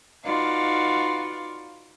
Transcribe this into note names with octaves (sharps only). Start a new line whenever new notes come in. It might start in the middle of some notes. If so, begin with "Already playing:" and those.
D#4 F4 F#4 B4 D5 F5